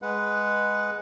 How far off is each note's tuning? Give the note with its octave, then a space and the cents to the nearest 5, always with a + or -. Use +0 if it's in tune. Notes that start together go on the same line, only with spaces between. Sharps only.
G#3 +0 B4 +0 F#5 -5